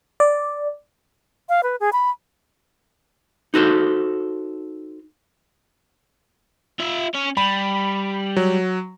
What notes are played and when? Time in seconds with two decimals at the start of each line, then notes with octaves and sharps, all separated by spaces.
0.20 D5
1.49 F5
1.63 B4
1.80 G#4
1.93 B5
3.54 D#4 F#4 A4 C5
6.80 F4 E5
7.15 C#4 C#5
7.37 G3 B5
8.36 F#3